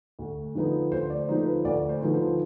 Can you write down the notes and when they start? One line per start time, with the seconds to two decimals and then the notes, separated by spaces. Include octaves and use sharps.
0.19 D2
0.55 D3 F3 B3 D#4
0.92 D2 C5
1.10 D5
1.28 D3 F3 B3 D#4 C5
1.46 B4
1.65 D2 D5
1.89 C5
2.01 D3 F3 B3 D#4
2.14 C5